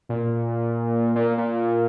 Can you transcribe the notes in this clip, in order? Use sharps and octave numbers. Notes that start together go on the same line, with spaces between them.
A#2
A#2
A#2